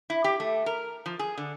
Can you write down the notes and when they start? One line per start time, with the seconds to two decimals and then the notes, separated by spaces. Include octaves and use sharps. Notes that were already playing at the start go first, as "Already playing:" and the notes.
0.10 E4
0.24 G4
0.40 A3
0.66 A#4
1.06 F3
1.19 G#4
1.38 D3